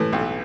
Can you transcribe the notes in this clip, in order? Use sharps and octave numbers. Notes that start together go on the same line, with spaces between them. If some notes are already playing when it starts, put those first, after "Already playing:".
Already playing: A2 E3
B1